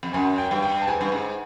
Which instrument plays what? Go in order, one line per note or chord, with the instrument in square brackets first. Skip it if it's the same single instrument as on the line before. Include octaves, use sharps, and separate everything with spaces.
[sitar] F2
[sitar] F#2 [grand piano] G#5
[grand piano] G5
[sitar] G2
[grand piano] G5
A5
[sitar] G#2 [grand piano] G#5
[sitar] G2
G#2